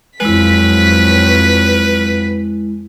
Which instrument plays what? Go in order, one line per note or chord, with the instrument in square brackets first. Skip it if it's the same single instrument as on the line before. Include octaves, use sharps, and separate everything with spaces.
[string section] F2 F#3 B6 [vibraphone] G#3 E4 [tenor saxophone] B4